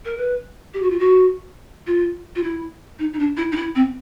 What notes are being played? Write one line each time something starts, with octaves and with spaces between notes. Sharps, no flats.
A#4
B4
G4
F#4
F4
F#4
F4
F4
E4
D#4
D#4
D4
E4
D#4
E4
C4